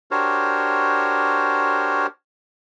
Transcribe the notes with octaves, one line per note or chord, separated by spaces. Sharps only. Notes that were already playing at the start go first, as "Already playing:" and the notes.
D4 F#4 G4 A#4 C5 C#5